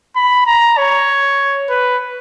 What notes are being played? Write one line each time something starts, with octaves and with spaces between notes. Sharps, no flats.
B5
A#5
C#5
B4